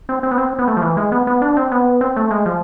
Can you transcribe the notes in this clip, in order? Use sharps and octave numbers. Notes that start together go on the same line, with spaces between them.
C4
C4
B3
C4
B3
A3
F3
E3
G#3
B3
B3
D4
C4
B3
C4
A3
G#3
F3